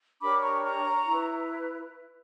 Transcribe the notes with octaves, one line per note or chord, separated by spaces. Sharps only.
D4 G4 A#4 C#5 B5 D6
A#5 C#6
A#5 C#6
E4 B4